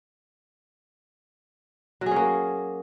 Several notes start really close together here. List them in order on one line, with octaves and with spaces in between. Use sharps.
F#3 G#4 C#4 A#3